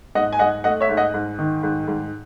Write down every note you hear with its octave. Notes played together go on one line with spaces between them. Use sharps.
G#2 D#5 F#5
G#5
G#2 D#5 F#5
A3 D#5 F#5
C#5 E5
G#2
D#5 F#5
G#2
D#3
G#2
G#2